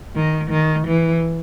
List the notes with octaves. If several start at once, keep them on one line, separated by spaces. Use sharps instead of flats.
D#3
D#3
E3